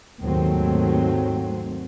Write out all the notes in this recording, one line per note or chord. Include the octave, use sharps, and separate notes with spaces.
D#2 G#2 D#3 F#3 A3 C4